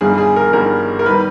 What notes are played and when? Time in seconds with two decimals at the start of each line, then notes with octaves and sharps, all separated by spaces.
0.01 G1 G2 D#3 G3 G#4
0.18 G#4
0.36 A#4
0.53 G1 G2 D#3 G3 A#4
0.99 A#4
1.06 D#3 G3 B4